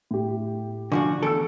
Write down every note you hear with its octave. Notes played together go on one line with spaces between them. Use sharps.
A2 G4
D3 F3 F#4 G#5 D6
E2 A4 E6 C#7 D7